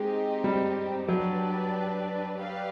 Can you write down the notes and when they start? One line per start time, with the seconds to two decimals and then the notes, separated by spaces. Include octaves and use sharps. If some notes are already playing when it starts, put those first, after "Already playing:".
Already playing: G#3 C4 D#4 G4
0.44 G3
1.08 F#3 D4 G4 B4 D5
2.37 G4 B4 D5 F5